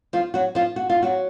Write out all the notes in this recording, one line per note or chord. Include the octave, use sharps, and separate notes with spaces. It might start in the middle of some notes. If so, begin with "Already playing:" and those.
F3 F4
F#3 F#4
F3 F4
F#4
F4
F#3 F#4